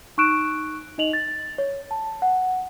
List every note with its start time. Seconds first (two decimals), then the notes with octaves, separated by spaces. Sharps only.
0.18 D#4 C#6 E6 F#6 D7 E7
0.98 D#4 D#5 F7 F#7
1.13 A6
1.58 C#5
1.91 A5
2.22 F#5